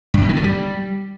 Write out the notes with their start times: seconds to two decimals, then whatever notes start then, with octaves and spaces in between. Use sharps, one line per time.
0.14 G2
0.21 B2
0.29 D#3
0.36 D3
0.44 G3